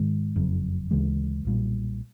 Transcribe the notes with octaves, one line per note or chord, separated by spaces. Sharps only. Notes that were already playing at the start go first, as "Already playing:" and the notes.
Already playing: G#2 D#3 G#3
F#1 F2 C#3 F#3
D2 C#3 E3 G#3
B1 A#2 G3